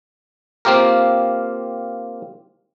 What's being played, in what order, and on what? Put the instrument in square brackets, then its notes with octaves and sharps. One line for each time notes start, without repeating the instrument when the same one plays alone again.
[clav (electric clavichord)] A#3 C4 F4 G4 A#4